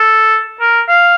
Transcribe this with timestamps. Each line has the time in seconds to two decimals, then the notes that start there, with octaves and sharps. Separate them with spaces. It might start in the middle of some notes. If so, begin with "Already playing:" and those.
Already playing: A4
0.61 A#4
0.88 F5